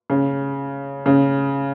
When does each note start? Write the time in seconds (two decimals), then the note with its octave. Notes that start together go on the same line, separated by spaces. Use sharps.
0.10 C#3
1.06 C#3